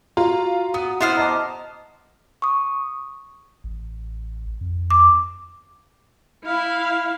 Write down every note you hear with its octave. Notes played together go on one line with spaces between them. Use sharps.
F4 F#4 A#5
B3 D#6
B3 E4 C5 C6 F6 F#6 A6
D#5 A5 A#5 D6
C#6 D#6
A1
F2
D6
E4 F5